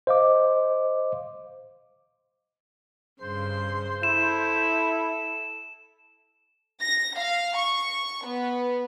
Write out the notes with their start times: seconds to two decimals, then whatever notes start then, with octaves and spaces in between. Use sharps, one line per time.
0.07 C5 D#5 F5 D6
3.22 G2 C#3 C5 C6
4.03 E4 A4 E7
6.82 A#6
7.19 F5
7.57 C#6
8.26 B3